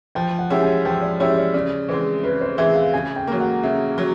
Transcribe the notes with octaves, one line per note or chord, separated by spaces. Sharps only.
F3 G5
F#5
G#3 C#4 E4 G4
G#5
F3 G5
D5
G#3 C#4 E4 G4 C#5
D5
C#3 D5
E3 G#3 C4 C5
C#3 B4
C5
E3 G#3 C4 E5
F5
C#3 G#5
G5
F#3 A#3
F#5
C#3 E5
F#3